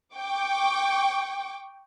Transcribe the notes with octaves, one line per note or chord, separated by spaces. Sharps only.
G5 C#6 D6